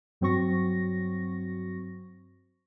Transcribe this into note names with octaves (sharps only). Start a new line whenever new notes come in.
G2 F#3 C4 F#4 C#6 A#6